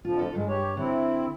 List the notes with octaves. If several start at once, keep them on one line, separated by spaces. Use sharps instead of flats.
F2 D3 F3 F4
F4 A4
G2 G#3
G4 C#5
D3 C4 E4